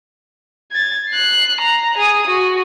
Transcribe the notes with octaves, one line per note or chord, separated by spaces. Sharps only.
G#6 A6
F#6 C7
A#5
G#4 D#6
F#4